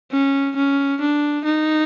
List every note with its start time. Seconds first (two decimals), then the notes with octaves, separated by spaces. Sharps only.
0.12 C#4
0.56 C#4
1.01 D4
1.45 D#4